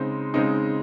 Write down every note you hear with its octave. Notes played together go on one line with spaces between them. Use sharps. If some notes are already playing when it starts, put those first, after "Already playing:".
Already playing: C#3 G#3 C4 D#4
C#3 G#3 C4 D#4